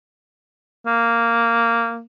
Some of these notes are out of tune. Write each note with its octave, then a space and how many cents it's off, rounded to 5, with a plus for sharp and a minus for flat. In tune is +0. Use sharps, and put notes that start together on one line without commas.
A#3 -10